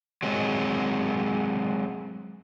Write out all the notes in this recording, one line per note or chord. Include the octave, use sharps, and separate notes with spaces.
F#3 G#3 C4